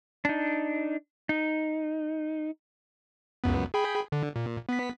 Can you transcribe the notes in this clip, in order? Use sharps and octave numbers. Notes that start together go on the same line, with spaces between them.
D4 D#4
D#4
C#2 F#2 B3
G#4 G5 B5
D3
A#2
B3 B6